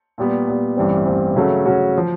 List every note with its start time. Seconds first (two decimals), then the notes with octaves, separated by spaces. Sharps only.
0.18 A#2 G3 B3
0.47 A#2 G3 B3
0.77 A1 G2 E3 G3 C4
1.06 A1 G2 E3 G3 C4
1.36 C#3 F#3 A3 C#4 F#4
1.66 C#3 F#3 A3 C#4 F#4
1.97 F3